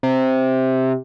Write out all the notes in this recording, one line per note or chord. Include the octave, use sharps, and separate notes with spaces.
C3